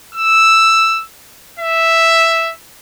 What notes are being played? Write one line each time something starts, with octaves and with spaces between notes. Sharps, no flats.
E6
E5